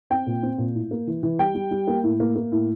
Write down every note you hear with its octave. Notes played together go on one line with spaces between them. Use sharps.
C4 G5
A#2
C4
A#2
A2
A#3
E3
E3
G3 G5
G3
G3
A#3
A2
A#3
A#3
A2